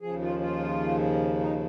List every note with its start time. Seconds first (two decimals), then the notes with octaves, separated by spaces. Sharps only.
0.01 D#2 C#3 F3 G#4
0.21 F4
0.41 F4
1.41 D#4